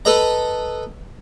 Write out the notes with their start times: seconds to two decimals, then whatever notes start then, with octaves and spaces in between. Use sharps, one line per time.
0.05 A4 B4 D#5 A#5